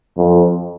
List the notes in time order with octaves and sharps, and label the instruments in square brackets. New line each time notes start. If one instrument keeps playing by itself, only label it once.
[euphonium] F2